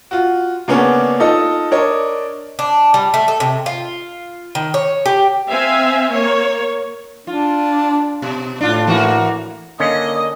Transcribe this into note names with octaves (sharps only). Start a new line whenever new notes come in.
F4 F#4
C#3 A#3 B3 C#4 D4
D#4 F4 A4 D#5
D4 A#4 C#5 D#5
D4
G3
A3
A4
C3
F4
D#3
C#5
G4
C4 E5 F5 G#5
A#3 C#5
D4 F4
B2
A2 D4 F4
E3 A#3 F#4
D3 A#3 C#4 D#5 D#6